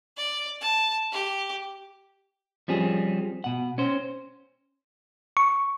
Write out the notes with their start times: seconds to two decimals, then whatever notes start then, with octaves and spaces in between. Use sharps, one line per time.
0.17 D5
0.61 A5
1.13 G4
2.68 F3 G3 C4 C#4 G#4
3.44 B2 F#5
3.78 C#4 C5
5.37 C#6